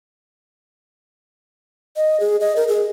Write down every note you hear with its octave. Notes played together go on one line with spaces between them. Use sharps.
D#5
G#4
D#5
A#4
G#4